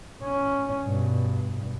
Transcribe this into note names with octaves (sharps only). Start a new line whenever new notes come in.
C#4
G2 B2